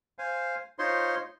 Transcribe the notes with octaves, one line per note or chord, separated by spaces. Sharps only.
C5 F5 G#5
D#4 F4 C5 C#5 C6